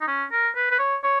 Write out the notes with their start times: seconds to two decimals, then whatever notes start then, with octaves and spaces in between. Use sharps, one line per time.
0.01 D#4
0.07 C#4
0.31 A#4
0.56 B4
0.71 B4
0.79 C#5
1.03 C#5